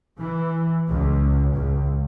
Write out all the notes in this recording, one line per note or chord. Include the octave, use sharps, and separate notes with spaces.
E3
C#2
C#2